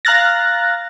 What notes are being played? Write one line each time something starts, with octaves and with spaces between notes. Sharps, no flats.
F5 A#5 F6 F#6 A6 A#6